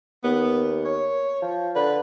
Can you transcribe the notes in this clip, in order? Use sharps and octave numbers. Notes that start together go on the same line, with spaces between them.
D#2 B3
C#5
F3
D3 B4